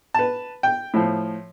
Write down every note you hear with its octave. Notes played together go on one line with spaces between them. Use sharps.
B4 A5
G5
A2 F3